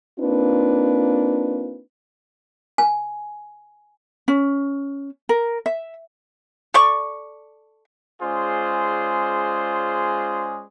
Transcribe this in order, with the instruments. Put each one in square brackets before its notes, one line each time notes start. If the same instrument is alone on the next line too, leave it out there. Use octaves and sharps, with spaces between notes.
[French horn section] A#3 C4 D4 D#4 F4 B4
[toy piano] G#5
[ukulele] C#4
A#4
E5
[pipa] A4 D5 C#6
[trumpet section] G#3 C#4 F4 G#4 C5 D5